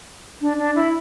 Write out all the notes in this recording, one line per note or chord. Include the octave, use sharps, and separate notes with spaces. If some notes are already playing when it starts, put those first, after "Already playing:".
D4
D4
E4